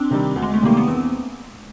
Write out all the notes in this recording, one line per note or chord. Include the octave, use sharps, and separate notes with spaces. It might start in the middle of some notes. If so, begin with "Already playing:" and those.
Already playing: C4 D4
C3 D#3 G3
D2
G#3
A3
C3 D#3 G3 A#3
B3
E2 C4